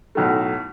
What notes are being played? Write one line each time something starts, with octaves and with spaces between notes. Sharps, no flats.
B1 A2 F#3 A3